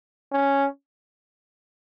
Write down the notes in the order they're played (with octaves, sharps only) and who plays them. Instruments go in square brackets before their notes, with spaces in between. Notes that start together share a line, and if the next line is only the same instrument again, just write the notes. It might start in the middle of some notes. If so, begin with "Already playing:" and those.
[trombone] C#4